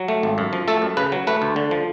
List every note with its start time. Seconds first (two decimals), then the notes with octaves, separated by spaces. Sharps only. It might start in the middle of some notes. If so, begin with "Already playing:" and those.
Already playing: F#3
0.08 A3
0.23 G#1
0.38 F#2
0.53 F3
0.68 A3 A4
0.82 F#2
0.97 C#3 B4
1.12 F#3
1.27 A3 B4
1.42 D2
1.56 D3
1.71 F3